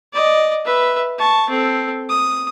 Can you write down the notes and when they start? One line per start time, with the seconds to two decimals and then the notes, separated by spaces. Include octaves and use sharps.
0.13 D5 D#5
0.65 B4 E5
1.18 A5 C#6
1.49 C4 A4
2.09 D#6